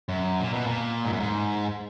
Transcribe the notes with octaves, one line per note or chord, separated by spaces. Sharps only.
F#2
A#2
B2
A#2
G#2
F#2
G#2